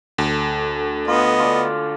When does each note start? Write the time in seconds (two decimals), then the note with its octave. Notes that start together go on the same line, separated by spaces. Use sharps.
0.18 D2 A4
1.08 B3 F4 D#5
1.39 F4 A4 D5